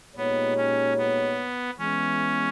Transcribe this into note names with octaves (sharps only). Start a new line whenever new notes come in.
A#2 G#3 B3 D#4 G4 C#5
C#4
B3
E3 G#3 B3 C#4